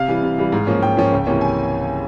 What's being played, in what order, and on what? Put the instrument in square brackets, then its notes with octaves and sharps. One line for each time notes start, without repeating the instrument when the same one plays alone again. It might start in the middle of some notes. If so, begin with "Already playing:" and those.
Already playing: [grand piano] C3 F5
E3 G3
C3
E3 G3
G#2
F3 A#3 C#4
G#2 G5
F3 A#3 C#4
C#2
C3 E3 A#3 C#4
G#5